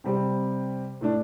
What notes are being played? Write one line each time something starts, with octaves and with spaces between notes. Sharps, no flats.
C3 G3 C4 G4
A2 A3 D4